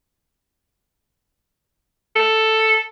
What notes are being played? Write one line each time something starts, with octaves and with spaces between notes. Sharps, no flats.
A4